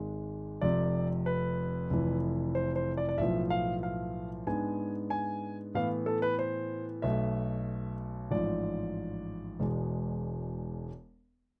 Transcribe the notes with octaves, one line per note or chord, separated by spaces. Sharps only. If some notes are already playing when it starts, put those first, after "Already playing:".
Already playing: G#1 G#2 G#3
F1 F2 C3 D5
B4
F1 F2 E3
C5
C5
D5
D5
B1 A2 F3 B3 E5
F5
F5
G#2 G#3 B3 D4 G#5
G#5
A2 E3 B3 F5
A4
B4
C5
B1 B2 A3 E5
A1 G#2 F3 D5
E1 E2 B2 G#3